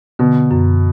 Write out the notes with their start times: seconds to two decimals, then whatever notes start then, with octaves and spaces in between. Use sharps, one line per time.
0.19 B2 D3
0.51 F#2